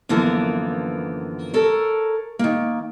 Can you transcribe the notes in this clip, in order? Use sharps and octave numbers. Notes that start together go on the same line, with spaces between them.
F#2 D3 E3 F3 A#3 B3
A4 A#4 C#5
D#3 A#3